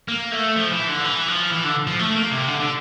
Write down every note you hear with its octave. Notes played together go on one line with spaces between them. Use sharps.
A#3
A3
F3
E3
D3
E3
F3
E3
D3
F3
A3
A#3
C3
D3
D3